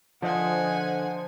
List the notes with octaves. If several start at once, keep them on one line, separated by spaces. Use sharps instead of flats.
D3 F3 C5 D#5 F#5 G#5